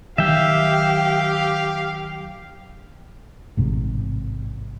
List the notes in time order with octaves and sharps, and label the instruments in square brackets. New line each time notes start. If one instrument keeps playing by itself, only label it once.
[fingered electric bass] D#3 F#3 [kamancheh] G4 [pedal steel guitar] E5 G5 [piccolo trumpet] F5
[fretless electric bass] A1 G#2 C3